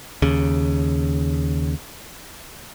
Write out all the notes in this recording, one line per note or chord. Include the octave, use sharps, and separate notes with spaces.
D#2 C#3